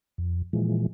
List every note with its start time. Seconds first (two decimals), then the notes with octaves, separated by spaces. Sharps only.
0.18 F2
0.53 A#2 E3 F3 G#3